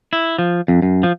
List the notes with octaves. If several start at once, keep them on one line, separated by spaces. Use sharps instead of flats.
E4
F3
F2
F#2
F3